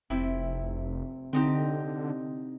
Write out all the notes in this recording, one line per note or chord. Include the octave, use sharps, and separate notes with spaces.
F1 C3 E4
D3 C4 D#4 G4